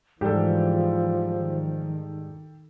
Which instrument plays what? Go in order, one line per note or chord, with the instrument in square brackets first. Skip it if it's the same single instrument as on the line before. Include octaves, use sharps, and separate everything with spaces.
[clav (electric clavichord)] G#2 G3 [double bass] E3 [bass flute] F3 [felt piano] G4 A4
[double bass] D#3